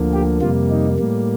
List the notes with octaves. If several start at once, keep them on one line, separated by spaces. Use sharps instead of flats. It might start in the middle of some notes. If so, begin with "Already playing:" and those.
Already playing: D2 D3 F3 A#3
G4
F2 C3 G3 A#3 F4
D#4
A2 G3 A#3